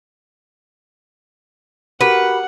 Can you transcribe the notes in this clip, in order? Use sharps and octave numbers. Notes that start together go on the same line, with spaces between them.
F#4 G4 A#4 B4 F#5